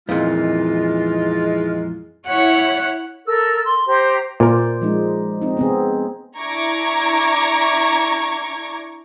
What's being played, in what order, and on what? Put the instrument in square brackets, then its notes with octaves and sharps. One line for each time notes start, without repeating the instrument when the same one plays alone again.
[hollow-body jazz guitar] F2 A#2 [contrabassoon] E3 [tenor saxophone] G#3 [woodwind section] D#4 F4
[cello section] E4 C#5 [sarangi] F#5
[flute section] A4 A#4 E6
C6
G4 C5 A#5 C6
[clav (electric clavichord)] A#2 A#4 [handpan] C5 D5
[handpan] F3 G#3 D#4
C4 D#4
B3 C4 G#4
[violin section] D4 E4 A#5 C#6 D6 G#6